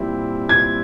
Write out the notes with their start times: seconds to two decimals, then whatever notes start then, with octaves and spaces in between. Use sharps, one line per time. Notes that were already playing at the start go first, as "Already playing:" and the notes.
Already playing: A#2 G3 C4 E4
0.49 G#6